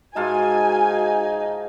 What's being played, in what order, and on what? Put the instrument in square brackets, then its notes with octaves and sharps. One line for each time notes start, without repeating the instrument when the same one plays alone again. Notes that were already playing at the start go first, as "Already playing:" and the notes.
[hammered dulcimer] G#2 F4 A5 [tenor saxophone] D#4 [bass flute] F#4 [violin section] G#5